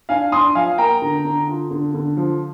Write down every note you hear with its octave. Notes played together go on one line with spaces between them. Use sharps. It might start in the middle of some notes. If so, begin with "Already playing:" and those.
D4 F5 G#5
D4 C6 D#6
F3 F5 G#5
A#3 G5 A#5
D3
D3
F4
D3
D3
F3